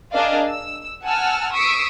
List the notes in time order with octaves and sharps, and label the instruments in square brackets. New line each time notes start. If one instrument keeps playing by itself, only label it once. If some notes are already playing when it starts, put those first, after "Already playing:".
[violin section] D4 G#4 A#4 D5 D#5 F5
E6
F#5 G#5 A5 E6 F6
C#6 D#6 E6 B6 C7 D7